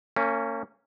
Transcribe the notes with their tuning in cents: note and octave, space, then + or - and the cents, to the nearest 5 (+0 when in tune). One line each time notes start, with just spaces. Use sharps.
A#3 -35 C#4 +0 G#5 -45